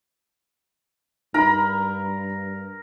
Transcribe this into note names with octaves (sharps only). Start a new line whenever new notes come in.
G2 D#4 A#4 A#5 B5